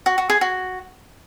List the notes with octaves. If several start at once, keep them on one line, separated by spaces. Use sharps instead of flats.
F#4
F#4
G#4
F#4